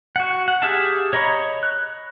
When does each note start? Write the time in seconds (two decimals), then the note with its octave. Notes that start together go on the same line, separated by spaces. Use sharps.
0.16 F#4 F#5
0.48 F#5
0.62 G4 G#4 E5 F5 A5
1.13 C#5 D#5 A#5 B5 C#6
1.63 F#6